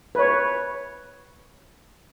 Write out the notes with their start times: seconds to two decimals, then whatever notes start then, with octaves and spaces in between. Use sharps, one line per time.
0.15 B4
0.19 C#5